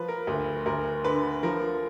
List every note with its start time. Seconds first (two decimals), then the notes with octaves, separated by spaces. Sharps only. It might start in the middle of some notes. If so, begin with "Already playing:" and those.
Already playing: F3 B4
0.09 A#4
0.27 D2
0.66 D2 A#4
1.05 D3 B4
1.43 F3 A#4